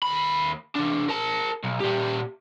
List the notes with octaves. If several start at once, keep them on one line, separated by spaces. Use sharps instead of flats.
D#2 B5
E3 D4
A#4 A5
B1
A#2 G4